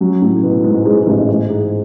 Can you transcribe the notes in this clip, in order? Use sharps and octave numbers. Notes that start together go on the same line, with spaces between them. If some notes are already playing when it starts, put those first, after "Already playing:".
F#2 F#3
A2 A3
B2 B3
G#2 G#3
G#2 G#3
G#2
A1 A2
G#2
G#2